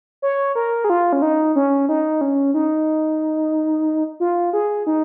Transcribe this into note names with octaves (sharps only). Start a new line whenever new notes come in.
C#5
A#4
G#4
F4
C#4
D#4
C#4
D#4
C#4
D#4
F4
G#4
D#4